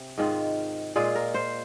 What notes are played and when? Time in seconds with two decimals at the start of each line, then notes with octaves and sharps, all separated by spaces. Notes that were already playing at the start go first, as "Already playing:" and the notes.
Already playing: C3
0.18 G#2 D#3 G#3 F4
0.96 A#2 G#3 F4 G#4
1.15 A#4
1.34 C5